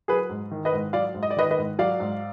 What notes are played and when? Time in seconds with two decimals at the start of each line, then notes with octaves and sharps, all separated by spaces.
0.08 F#3 G#4 B4
0.30 G#2
0.51 D#3
0.65 B4 D#5
0.73 G#2
0.93 F#3 D5 F5
1.15 G#2
1.23 D#5
1.31 D5
1.37 D#3 B4 D#5
1.51 B4 D#5
1.57 G#2
1.79 F#3 D5 F5
2.00 G#2